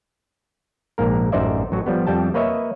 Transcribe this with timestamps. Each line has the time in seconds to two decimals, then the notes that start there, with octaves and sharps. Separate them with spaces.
0.98 A#1 G#2 A#3 A#4
1.32 A1 F#2 D#4 C5 D5 E5
1.72 A1 F#3 F#4
1.86 F3 G3 B3
2.07 F2 G3 G5 A5
2.34 A#3 B4 C#5 D#5 E5